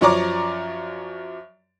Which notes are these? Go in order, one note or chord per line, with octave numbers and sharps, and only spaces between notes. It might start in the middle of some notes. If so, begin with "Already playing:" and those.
F#2 F3 C#5 D5 A#5 D6